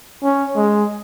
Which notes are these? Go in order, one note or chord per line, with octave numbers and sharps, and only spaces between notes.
C#4
G#3